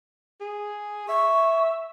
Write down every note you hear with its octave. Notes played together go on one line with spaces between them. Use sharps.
G#4
E5 C#6